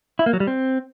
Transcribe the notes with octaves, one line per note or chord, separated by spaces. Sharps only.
E4
A#3
F#3
G3
C4